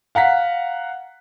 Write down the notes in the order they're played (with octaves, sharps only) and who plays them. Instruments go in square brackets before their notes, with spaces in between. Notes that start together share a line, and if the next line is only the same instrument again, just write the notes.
[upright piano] F5 F#5 A#5 B6